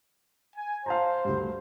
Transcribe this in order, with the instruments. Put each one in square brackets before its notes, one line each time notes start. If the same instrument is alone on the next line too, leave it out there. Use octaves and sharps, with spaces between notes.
[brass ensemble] G#5
[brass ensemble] C5 [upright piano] F5 A5 A#5
[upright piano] D2 G2